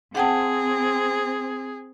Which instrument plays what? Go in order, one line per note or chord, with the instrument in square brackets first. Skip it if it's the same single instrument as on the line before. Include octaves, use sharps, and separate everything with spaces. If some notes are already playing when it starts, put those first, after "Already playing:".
[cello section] C4 [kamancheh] G#4 [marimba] F#5 G5 A5